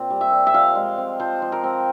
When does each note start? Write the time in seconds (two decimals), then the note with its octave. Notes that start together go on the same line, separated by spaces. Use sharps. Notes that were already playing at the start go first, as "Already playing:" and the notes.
Already playing: A#2 C4
0.10 G3
0.21 E5
0.31 A#2
0.47 E5
0.54 F3 F5
0.75 G#3
0.98 C4
1.20 F3 C5
1.42 F3
1.52 A#4
1.63 C4